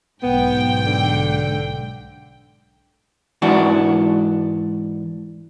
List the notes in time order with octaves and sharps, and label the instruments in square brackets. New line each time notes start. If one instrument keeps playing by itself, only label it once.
[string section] B1 G#2 G5 [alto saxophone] B3
[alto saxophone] D3
[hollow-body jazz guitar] G#2 E3 D4 F#4